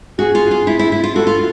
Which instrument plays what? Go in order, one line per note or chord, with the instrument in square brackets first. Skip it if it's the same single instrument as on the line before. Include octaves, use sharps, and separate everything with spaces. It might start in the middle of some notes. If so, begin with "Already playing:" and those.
[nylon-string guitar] F#4 [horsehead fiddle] G#4
[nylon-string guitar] F4
F4
E4
E4
E4
F4
[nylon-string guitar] F#4 [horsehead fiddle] A4
[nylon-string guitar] F4